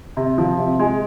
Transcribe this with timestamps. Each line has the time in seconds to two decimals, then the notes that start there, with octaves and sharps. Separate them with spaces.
0.17 C3
0.38 F3
0.59 C3
0.79 G#3